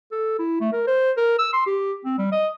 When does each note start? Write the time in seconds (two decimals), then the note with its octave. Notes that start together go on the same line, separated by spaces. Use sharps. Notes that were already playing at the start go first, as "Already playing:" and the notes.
0.12 A4
0.39 E4
0.60 A3
0.73 A#4
0.87 C5
1.17 A#4
1.38 E6
1.53 C6
1.66 G4
2.05 C4
2.18 G3
2.32 D#5